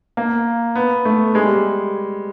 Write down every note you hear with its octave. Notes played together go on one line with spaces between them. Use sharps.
A#3
B3
A3
G#3
G3